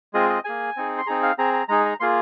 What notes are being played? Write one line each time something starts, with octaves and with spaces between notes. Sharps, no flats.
G#3 C4 F4 G#4 D#5
D#5
A#3 G#4 G#5
C4 D#4 G#4
C6
C4 D#4 G#4 A#5
F5
C4 G#4 A#5
A#5
G#3 D#4 G#4 A#5
A#5
A#3 F4 G#4 C6